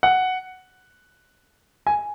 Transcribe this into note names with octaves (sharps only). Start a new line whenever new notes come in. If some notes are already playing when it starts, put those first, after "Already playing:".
F#5
G#5